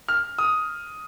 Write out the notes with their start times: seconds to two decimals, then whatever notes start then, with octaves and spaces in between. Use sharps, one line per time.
0.08 F6
0.38 D#6